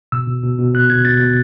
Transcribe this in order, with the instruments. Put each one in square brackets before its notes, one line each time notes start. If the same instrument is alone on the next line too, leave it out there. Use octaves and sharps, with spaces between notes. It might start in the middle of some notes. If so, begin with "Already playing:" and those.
[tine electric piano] B2 E6
B2
B2
B2
B2 F#6
B2 G#6
B2 A6
B2